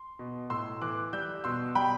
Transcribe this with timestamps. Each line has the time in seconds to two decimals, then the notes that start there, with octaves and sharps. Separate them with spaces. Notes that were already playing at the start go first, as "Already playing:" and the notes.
Already playing: C6
0.19 B2
0.50 A2 C6 E6
0.82 E3 D6 F#6
1.13 G3 E6 G6
1.44 B2 C6 E6
1.75 G3 G5 B5